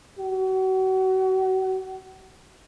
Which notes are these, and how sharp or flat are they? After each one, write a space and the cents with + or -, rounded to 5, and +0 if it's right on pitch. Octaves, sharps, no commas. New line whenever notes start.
F#4 +35